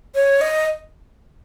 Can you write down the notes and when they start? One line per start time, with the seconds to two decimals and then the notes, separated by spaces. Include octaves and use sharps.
0.15 C#5
0.41 D#5